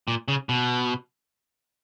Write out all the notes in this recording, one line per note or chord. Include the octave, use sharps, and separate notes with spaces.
A#2
C#3
B2